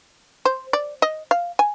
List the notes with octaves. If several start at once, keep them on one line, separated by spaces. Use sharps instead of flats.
C5
D5
D#5
F5
G#5